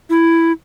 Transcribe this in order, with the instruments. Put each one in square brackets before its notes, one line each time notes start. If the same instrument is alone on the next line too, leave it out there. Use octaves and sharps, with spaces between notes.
[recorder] E4